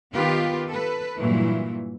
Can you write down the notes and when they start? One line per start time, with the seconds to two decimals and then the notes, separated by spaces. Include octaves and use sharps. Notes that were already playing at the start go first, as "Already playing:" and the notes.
0.12 D#3 B3 F4 G4 B4
0.68 A4 B4
1.17 G2 A#2 E3 F#3 E4